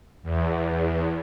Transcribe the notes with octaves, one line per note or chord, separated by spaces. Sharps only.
E2